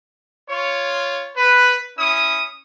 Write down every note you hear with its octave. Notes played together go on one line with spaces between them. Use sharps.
F4 C#5
B4
C#4 E4 D#6